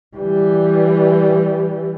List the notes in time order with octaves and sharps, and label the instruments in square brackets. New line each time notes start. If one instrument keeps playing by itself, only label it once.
[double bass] E3 G3